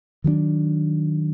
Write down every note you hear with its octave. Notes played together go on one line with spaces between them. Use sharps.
D#3 F#3 A#3 D4